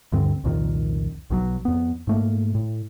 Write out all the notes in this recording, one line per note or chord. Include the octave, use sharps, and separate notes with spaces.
D2 G2 D3 C4
C2 F2 A#2 D#3
B1 B2 D3 F#3
F2 B3
G#2 A3 A#3
A2